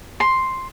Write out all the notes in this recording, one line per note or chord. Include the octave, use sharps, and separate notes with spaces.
C6